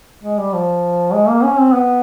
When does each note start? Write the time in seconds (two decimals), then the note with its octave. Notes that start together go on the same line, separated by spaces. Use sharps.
0.23 G#3
0.39 G3
0.53 F3
1.13 G#3
1.28 A#3
1.43 C#4
1.58 C4
1.73 B3